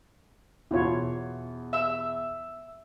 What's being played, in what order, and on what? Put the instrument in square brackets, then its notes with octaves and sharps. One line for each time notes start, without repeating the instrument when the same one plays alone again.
[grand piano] E2 B2 [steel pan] E4 F4 C#5
[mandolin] E5 E6